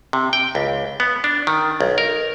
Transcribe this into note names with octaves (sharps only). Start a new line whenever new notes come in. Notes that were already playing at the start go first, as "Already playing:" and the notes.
C3
G5
C#2
B3
D4
D#3
B1
A#4